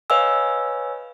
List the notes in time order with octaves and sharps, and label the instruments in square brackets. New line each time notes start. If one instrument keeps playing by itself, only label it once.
[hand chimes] B4 C#5 D#5 F5 G#5 E6